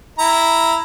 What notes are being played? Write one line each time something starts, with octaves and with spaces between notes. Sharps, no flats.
E4 A#5